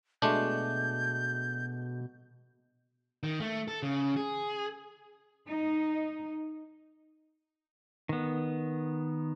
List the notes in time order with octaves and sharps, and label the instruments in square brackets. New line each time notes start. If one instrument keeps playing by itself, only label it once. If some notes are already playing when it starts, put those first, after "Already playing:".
[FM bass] B2 [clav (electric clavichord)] G#3 A3 D4 [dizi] G6
[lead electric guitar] D#3
A3
A4
C#3
G#4
[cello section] D#4
[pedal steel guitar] D#3 B3